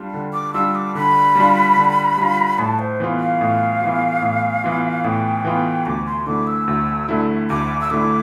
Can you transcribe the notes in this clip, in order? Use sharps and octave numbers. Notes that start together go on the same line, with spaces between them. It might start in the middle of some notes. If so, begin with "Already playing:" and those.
Already playing: G3 D4 F4
D3
D6
G3 D4 F4 E6
D6
D3 B5
G3 D4 F4
D3
G3 D4 F4
A2 A5
C5
E3 B3 F4
F5
A2
E3 B3 F4
A2
E3 B3 F4
A2 G5
E3 B3 F4
D2 D6
C6
D3 A3 E4 D6
E6
D2
D3 A3 E4
D2 D6
E6
D3 A3 E4 D6